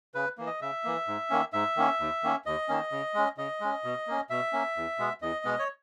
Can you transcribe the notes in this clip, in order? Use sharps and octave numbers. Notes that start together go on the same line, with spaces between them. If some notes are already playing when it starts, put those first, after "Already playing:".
C#3 B4
E3 A#3
D#5
C#3 E5
E3 A#3
G#2
D#3 A#3 C#4
G#2 E5
D#3 A#3 C#4
D#2
D#3 A#3 C#4
D#2 D#5
D#3 A#3 C#4
C#3
G#3 C#4
C#3 D#5
G#3 C#4
B2
A#3 C#4
B2 E5
A#3 C#4
E2
B2 G#3 B3
E2 D#5
B2 G#3 B3
C#5